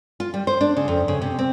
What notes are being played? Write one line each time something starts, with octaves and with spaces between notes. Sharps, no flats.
F4
G3
C5
D4
C#3
F2
C#3
C3
C4